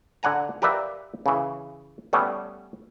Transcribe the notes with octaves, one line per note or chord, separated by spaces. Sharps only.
D3 D5 F#5 G#5 A#5
G4 A#4 B4 D5 E5 F5
C#3 E3
G3 A3 B3 C#4